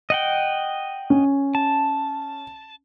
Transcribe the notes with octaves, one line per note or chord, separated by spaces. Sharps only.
D#5 F#5 G5
C#4
A5